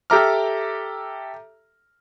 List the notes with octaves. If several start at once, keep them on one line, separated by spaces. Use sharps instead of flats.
G4 A4 E5 A#5 D6 F6